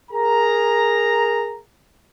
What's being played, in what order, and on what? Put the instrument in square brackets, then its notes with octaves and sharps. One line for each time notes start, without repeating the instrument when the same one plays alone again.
[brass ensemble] G#4 A#4 A#5